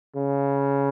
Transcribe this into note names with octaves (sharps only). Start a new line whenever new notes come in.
C#3